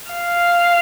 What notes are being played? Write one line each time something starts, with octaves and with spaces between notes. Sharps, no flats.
F5